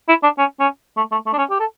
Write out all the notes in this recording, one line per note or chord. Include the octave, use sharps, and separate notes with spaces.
E4
D4
C#4
C#4
A3
A3
A3
D4
C#4
G4
A4